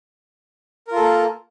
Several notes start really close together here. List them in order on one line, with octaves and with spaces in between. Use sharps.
A#4 F4 A4 A#3